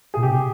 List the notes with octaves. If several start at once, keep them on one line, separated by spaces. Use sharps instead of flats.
A#2 G#4
C3 G4